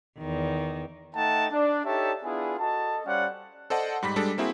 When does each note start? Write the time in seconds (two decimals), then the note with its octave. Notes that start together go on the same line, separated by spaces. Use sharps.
0.19 E2 D#3
1.15 A3 D#4 E5 F#5 G5 A5
1.52 D4
1.85 D#4 G4 A4 C#5 E5 A5
2.23 B3 D4 E4 F4 G#4
2.59 F#4 A4 D#5 A5
3.05 G3 C#4 C5 D5 F5 F#5
3.70 A4 C5 D5 D#5 F#5 A5
4.02 G#2 G3 B5 B6
4.16 G3 G#3 D4 A4
4.38 A#3 C4 E4 F#4 G#4